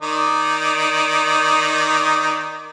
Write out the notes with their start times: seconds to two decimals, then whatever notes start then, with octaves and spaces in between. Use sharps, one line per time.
0.02 D#3 D#4 D5